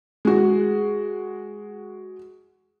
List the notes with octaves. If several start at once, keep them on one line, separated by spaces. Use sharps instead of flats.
G#3 F#4